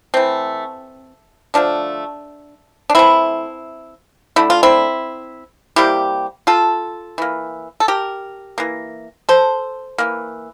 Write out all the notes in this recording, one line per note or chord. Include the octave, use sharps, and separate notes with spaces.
E3 A3 C4
D3 F3 A3 D4
D4
E3 A3 C4 E4
D3 A3 E4
F4
C4 E4
C3 G3 A#3 E4 G4
F4 A4
E3 A#3
A4
G4 A#4
E3 A#3
A4 C5
E3 A#3